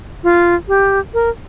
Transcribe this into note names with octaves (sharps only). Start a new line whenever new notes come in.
F4
G4
A#4